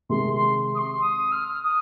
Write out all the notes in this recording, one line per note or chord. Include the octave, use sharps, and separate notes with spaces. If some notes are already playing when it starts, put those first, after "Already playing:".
C3 D#3 G#3 C6
C6
D#6
C6
D#6
F6
D#6